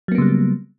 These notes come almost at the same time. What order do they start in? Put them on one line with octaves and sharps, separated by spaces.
F#3 A#3 B3 C#3 G3